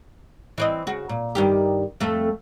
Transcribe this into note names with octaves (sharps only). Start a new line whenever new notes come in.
E3 C4 D#5
C#3 F#4
A#2
G2 D#3 G4
F2 A3